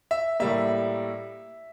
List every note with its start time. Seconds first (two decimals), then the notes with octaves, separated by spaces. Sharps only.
0.11 E5
0.40 A2 G3 A#3 E5